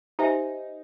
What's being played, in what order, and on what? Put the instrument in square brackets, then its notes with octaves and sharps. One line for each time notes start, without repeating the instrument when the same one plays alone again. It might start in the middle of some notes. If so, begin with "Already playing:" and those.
[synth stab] D#4 [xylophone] G4 C5 E5 G#5